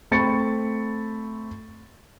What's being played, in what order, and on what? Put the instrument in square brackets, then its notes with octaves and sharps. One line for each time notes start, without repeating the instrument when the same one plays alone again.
[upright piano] A3 C4 B5 C#6 A6 C#7